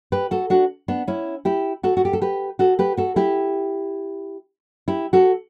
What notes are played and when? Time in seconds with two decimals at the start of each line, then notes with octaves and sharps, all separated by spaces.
0.12 G4 B4
0.31 F#4 A4
0.50 D4 F#4
0.88 B3 D4
1.08 C#4 E4
1.45 E4 G4
1.83 F#4 A4
1.97 F#4
2.05 G4
2.13 A4
2.22 G4 B4
2.59 F#4 A4
2.79 G4 B4
2.97 F#4 A4
3.16 E4 G4
4.88 E4 G4
5.13 F#4 A4